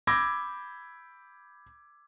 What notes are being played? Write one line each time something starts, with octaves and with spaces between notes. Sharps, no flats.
B5 D6 E6 G6 G#6 A#6